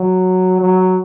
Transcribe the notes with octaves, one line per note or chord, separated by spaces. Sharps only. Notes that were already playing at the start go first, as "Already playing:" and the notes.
Already playing: F#3
F#3